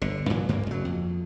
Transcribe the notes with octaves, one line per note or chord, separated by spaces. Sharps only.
G1 D3
F#2 A#2 E3 F#3
D2 G2 A#3
F#1 F#3
F2